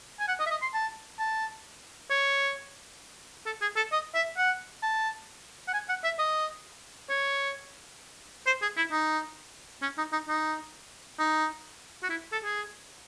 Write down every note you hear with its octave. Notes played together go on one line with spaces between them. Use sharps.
G#5
F#5
D#5
E5
D#5
C6
A5
A5
C#5
A4
G#4
A4
D#5
E5
F#5
A5
F#5
G#5
F#5
E5
D#5
C#5
C5
G#4
E4
D#4
C#4
D#4
D#4
D#4
D#4
F#4
E4
A4
G#4